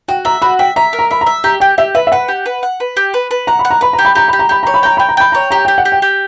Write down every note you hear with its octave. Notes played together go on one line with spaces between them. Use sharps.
F#4 G5
E5 A#5
F#4 B5
E5 G5
E5 A#5
A#4
A#5
E5 B5
A#5
E5
G4 A#5
G4 G5
G4 E5
B4 E5
E5
B4 F#5
G4
B4
F#5
B4
G4
B4
B4
F#5 A#5
B5
F#5
A#5
B4 B5
A#5
G4
B5
G4 A#5
G4 B5
A#5
G4 B5
C#5 A#5
B5
G5 A#5
G5 B5
A#5
G5 B5
C#5 A#5
G4 A#5
G4 G5
F#5
G4
G5
G4